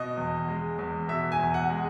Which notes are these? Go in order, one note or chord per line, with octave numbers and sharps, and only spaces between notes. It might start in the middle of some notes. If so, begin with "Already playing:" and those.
Already playing: B2 D#5
E2
G#3
E2
B2 E5
G#5
E2
F#5
G#3